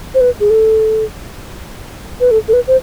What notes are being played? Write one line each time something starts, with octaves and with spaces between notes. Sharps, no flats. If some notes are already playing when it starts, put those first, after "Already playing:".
C5
B4
G#4
A4
B4
A4
A4
B4
C5